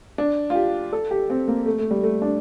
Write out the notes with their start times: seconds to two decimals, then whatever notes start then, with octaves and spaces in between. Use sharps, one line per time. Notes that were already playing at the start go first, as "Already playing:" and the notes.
0.18 D4
0.50 F4
0.55 G4
0.93 A4
1.11 G4
1.30 C4
1.48 A#3
1.66 A3
1.79 A3
1.91 G3
2.03 A3
2.22 D4